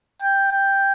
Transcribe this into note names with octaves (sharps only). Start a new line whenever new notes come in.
G5
G5